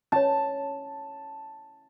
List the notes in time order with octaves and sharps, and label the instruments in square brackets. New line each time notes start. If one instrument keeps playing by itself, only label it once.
[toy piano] C#4 C#5 [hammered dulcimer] A5